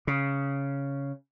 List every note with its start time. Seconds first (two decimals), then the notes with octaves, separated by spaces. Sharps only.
0.07 C#3